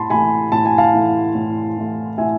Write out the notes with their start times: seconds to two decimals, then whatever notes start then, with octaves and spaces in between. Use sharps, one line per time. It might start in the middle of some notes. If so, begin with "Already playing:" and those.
Already playing: A2 A5 B5 C6
0.10 E3 A3 G#5 B5
0.52 A2 A5
0.65 G#5
0.78 F5 A5
0.94 E3 A3
1.35 A2
1.77 E3 A3
2.18 A2 E5 G#5